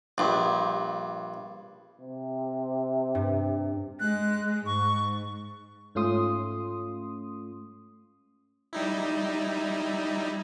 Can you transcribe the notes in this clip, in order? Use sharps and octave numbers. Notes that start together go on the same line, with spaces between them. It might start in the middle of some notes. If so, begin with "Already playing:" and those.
A#1 G2
C3
G2
G#3 F#6
G#2 C#6
G#2 A3 C#4 F4 C6 D#6
G3 D#4 E4